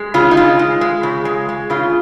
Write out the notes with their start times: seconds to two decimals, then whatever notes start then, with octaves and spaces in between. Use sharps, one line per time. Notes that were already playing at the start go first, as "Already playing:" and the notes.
Already playing: G#3
0.14 C#3 F4
0.31 D#4
0.37 G#3 F4
0.59 G#3
0.81 G#3
1.03 C#3
1.25 G#3
1.49 G#3
1.70 C#3 F4